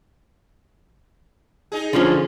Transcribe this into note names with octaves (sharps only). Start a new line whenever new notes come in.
D#4 G#4
D3 F3 C#4